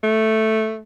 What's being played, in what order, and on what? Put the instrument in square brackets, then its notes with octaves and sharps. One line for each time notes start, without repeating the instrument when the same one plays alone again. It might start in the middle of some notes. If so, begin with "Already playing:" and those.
[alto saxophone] A3